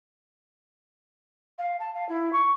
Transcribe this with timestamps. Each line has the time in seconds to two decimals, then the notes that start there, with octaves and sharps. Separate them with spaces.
1.58 F5
1.79 A5
1.94 F5
2.09 E4
2.32 C#6